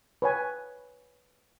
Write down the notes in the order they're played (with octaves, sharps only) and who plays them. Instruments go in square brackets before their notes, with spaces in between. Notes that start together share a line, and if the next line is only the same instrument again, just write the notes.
[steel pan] B4 C#5 G#5